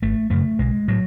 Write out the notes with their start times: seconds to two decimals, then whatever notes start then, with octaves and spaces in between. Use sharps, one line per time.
0.02 G#1 A3
0.30 F#2 C#3 A3
0.59 B1 G#3
0.88 A2 F#3